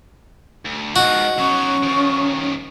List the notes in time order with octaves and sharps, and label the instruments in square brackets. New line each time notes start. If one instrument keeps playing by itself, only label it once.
[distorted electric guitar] D2
[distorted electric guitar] G#2 F3 [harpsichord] F#4 [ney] D#5
[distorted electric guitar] F#3 D#4 [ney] C#4 [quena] C#6
[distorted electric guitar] D#3 F3